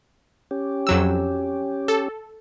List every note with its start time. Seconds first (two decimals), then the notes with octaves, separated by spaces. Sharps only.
0.51 C#4 G4
0.87 F2 F#3 E6
1.88 A4